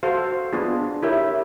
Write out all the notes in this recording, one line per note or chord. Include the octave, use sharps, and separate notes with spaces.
F#4 A4 C5 F5
B3 D4 F4 G#4
E4 G4 A#4 C#5 E5